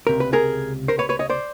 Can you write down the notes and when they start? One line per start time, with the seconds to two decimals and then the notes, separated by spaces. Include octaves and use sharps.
0.07 C#2 C3 A#4
0.20 B4
0.33 G#4 A#4
0.88 A#4 C5
0.99 B4 C#5
1.09 B4 C#5
1.19 C#5 D#5
1.30 C5 D5